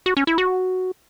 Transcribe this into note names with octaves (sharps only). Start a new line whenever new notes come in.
F#4
C#4
E4
F#4